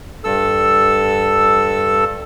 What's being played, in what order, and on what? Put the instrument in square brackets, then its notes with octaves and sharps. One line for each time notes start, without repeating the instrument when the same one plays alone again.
[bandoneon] G2 A4 E6